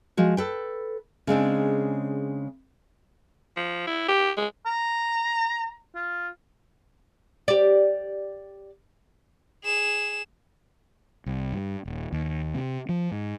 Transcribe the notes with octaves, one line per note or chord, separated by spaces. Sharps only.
F3 G#3 F#4
A4 B4 G5
C#3 G#3 C4 D4
F3
E4
G4
G#3
A#5
F4
G4 D5
G#4 E7
C2
G2
D#1
D#2
C3
F3
G#2